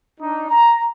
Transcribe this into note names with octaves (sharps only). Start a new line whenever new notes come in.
D4 D#4
A#5